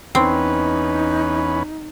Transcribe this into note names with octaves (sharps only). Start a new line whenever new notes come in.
E2 C4 C#4 D#4 B4